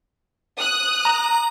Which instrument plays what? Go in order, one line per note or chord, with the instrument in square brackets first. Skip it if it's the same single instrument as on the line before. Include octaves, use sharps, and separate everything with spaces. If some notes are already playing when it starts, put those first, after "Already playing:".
[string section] D#6 F#6
[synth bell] A#5